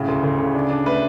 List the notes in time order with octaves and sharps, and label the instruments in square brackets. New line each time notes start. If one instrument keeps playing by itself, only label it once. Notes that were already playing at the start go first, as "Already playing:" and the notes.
Already playing: [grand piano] A2 C#3
D2
D2
C#3
D4
D4
A3 B4